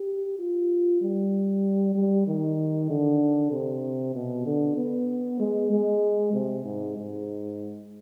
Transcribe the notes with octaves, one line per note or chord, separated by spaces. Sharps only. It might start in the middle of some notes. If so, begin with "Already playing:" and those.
Already playing: G4
F4
G3
G3
D#3
D3
C3
B2
D3
B3
G#3
G#3
C3
G#2
G#2